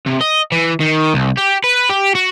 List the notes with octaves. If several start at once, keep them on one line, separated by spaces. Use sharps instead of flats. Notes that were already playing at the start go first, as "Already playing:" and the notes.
C3
D#5
E3
D#3
C2
G4
B4
G4
F#4